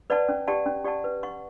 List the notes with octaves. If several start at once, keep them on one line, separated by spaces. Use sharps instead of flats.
B4 D5 F#5 A5
C#4
G4 D5 F#5 A5
C#4
G4 D5 F#5 A5
B4
F#5 C#6